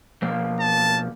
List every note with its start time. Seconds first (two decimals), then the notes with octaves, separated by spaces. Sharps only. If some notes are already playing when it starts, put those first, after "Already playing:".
0.22 B2 F3 A#3
0.60 A5